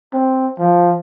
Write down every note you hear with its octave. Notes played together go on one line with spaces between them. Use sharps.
C4
F3